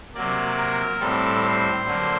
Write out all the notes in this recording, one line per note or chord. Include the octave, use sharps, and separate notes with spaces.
C3 F#3 A#3 D5
A#4
A2 G3 C4 A4
C5
D3 F#3 A#3